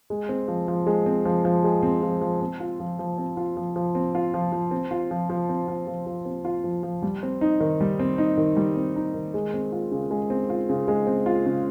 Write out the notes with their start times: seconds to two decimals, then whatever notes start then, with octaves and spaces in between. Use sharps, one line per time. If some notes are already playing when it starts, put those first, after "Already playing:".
0.10 G#3
0.29 C4
0.48 F3
0.68 F3
0.87 G#3
1.06 C4
1.25 F3
1.45 F3
1.64 G#3
1.83 C4
2.03 F3
2.21 F3
2.41 C4
2.60 F4
2.80 F3
2.99 F3
3.18 C4
3.37 F4
3.57 F3
3.76 F3
3.95 C4
4.15 F4
4.34 F3
4.52 F3
4.71 C4
4.91 F4
5.11 F3
5.30 F3
5.49 C4
5.68 F4
5.87 F3
6.07 F3
6.25 C4
6.45 F4
6.64 F3
6.83 F3
7.02 G3
7.23 C4
7.41 D#4
7.60 D#3
7.81 G3
7.99 C4
8.18 D#4
8.37 D#3
8.57 G3
8.76 C4
8.96 D#4
9.14 D#3
9.34 G#3
9.54 C4
9.72 F4
9.92 C#3
10.11 G#3
10.30 C4
10.50 F4
10.69 C#3
10.88 G#3
11.07 C4
11.26 F4
11.46 C#3